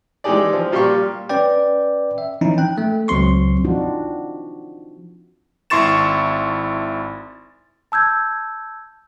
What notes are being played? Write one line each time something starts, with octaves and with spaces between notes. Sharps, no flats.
E3 G#3 D#4 G4 G#4 D5
F3
A#2 G3 G4 F5 C6 C#6
C#4 B4 D5 G5
E5
E3 F3 C4 C#4 D#4 E4
G5 F#6
A3
C#2 F#3 C4 C6 C#6
F3 C4 D4 D#4 F4 F#4
G#1 E4 C6 C#6 A6 E7
A5 E6 G6 G#6